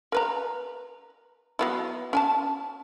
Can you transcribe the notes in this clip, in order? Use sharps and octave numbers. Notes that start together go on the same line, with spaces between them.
A#4 B4 A#5
F#3 B3 E4
C#4 G#5 A5